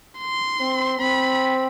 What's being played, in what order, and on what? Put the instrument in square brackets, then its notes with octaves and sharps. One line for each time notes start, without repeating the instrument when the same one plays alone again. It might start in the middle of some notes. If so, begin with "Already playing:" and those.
[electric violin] C6
[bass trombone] C4
[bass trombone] C4 [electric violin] B5